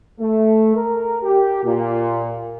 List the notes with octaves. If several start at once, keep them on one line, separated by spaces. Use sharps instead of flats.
A3
A#4
G4
A#2